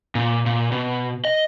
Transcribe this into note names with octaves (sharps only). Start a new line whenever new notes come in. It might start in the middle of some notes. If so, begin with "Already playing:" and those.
A#2
A#2
B2
D#5